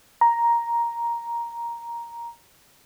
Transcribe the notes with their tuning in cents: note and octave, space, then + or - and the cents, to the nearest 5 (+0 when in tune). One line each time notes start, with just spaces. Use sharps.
A#5 +5